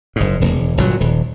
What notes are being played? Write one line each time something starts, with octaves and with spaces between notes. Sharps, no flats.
F#1 G#2
E1
G1 A#2 D3 F#3
D#1